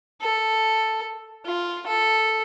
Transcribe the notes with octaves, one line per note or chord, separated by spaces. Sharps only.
A4
F4
A4